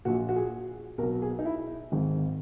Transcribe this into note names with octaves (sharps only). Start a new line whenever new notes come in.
A#1 A#2 F#4
F#4
G#4
B1 B2 A#4
G#4
D#4
E4
G#1 G#2 D#3